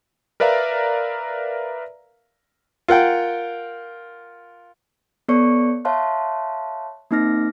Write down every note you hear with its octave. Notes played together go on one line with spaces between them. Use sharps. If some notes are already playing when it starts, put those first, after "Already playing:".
A#4 B4 D5 E5 F5 A#5
F4 A#4 F#5 G5
B3 A4 C#5 D5 C#6 C#7
C#5 E5 F5 A5 C6 F#6
A#3 C4 D#4 D6 F6 A#6